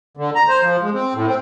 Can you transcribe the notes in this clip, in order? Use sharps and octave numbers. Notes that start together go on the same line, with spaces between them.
D3
A#5
C5
F3
G#3
C4
A2
C4